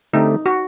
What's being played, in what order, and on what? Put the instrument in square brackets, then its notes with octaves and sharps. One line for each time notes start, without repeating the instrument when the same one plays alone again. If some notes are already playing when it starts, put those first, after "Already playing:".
[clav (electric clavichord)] D3 A3 C4 G4 [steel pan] D#4
[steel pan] F#4